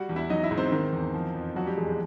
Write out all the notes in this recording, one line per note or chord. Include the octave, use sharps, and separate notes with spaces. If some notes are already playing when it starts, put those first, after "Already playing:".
Already playing: G3 F#4 F#5
E2
E4 E5
F#3 D#4 D#5
E4 E5
G#2
C4 C5
D#3
E2
F3
F2
F3 F#3 F#4
G3 G4
E2 G#3 G#4
G#3 G#4